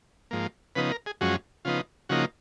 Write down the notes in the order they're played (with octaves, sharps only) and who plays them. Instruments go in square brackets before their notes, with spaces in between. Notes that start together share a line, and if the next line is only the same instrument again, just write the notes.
[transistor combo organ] G#2 F3 A#3
C#3 F3 B3 D#4 B4
A#4
G#4
F#2 F3 G#3 C#4 F#4
C#3 F3 B3 D#4 F4
C#3 F3 A#3 D#4 F#4